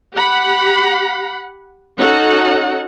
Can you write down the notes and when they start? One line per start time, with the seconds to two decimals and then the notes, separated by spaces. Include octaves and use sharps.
0.13 G4 F#5 B5
1.98 C#4 D#4 F#4 A4 F#5